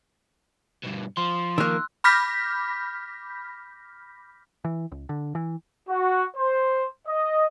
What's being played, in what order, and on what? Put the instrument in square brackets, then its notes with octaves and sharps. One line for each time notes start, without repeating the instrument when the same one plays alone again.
[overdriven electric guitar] G2 B2
[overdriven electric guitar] F3 [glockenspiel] C6
[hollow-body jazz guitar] D#3 A#3 [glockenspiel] E6 F#6
[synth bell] B5 D6 F6 G6 A#6 B6
[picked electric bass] E3
C#2
D3
E3
[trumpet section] F#4
C5
D#5